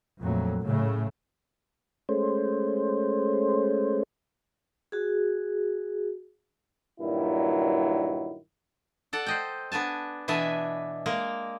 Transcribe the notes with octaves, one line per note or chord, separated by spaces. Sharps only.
F2 A#2 F#3 A3
A2 C#3 A3
G#3 A3 C#4 C5
F#4 G#4
G2 A#2 D#3 F#3 E4
A4 D5 F#5
C5 D#5 G5
B3 D4 G#5 A5
B2 E3 D4 D#5 E5 G#5
G#3 A#3 A#4